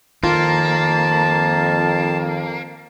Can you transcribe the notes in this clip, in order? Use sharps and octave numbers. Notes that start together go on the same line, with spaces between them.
F2 D#3 A#3 F4 A5